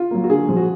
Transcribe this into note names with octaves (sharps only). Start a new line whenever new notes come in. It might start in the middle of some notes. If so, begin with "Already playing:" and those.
Already playing: F4
F#3 A#3
F#4
D3 G#4
F3 G#3
F#4